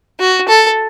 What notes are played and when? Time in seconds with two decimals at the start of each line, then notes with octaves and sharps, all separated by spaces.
0.20 F#4
0.48 A4